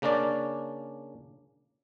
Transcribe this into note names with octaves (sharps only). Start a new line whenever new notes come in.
C#3 A#3 C#4 D4 D5